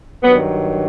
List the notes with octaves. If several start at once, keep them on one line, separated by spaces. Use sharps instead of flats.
G2 D#3 F#3 B3